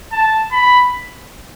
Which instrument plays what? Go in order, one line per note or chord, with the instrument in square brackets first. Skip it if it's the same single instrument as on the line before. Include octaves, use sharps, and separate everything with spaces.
[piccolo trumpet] A5
B5